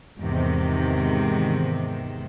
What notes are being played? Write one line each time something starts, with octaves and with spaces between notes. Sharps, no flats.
E2 G#2 C3 D#3